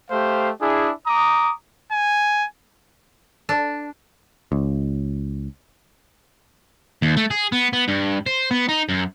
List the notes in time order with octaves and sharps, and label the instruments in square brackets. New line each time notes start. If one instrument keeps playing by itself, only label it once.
[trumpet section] A3 G4 C5 F5
D4 E4 G#4
A#5 D6 D#6
[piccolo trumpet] G#5
[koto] D4
[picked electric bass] C#2
[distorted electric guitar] D#2
A3
G#4
B3
B3
G2
C5
B3
D#4
F#2